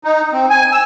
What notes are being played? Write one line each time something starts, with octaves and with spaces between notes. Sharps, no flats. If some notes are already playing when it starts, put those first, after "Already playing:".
D#4
C4
G#5
E6